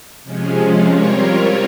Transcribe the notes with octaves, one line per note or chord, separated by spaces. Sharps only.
C3 F3 G#3 C#4
G3 C4 F4 A#4 C#5